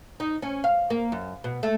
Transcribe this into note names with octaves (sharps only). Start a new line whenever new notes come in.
D#4
C#4
F5
A#3
F#2
B2
A3